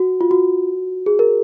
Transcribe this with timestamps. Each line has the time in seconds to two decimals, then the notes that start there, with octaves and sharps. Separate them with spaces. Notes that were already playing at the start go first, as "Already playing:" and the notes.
Already playing: F#4
0.21 F4
0.31 F#4
1.06 G#4
1.19 A#4